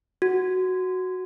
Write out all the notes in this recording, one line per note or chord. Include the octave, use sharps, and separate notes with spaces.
F#4